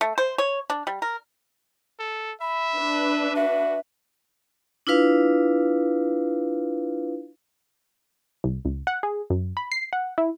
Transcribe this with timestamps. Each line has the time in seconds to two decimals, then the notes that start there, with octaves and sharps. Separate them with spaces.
0.01 A3
0.18 C5
0.38 C#5
0.70 D4
0.87 G3
1.02 A#4
1.99 A4
2.41 E5 B5
2.77 D4 B4
3.36 F#4 E5
4.87 D4 E4 F4 B4 F5
8.44 C2
8.65 C#2
8.87 F#5
9.03 G#4
9.30 F#2
9.57 B5
9.72 C7
9.93 F#5
10.18 E4